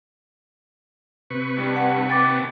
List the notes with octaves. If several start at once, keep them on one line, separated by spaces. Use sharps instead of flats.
C3 B4 C#6
G2
F#5
D#2 G5 D6 A6